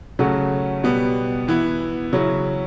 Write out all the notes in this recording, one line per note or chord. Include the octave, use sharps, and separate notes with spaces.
C#3 F#3 A3 C#4 F#4
B2 G3 B3
E3 B3 E4
C#3 F#3 C#4 E4